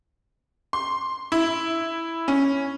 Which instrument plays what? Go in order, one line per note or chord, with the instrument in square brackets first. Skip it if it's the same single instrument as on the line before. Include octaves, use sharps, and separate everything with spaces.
[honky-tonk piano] C6
E4
C#4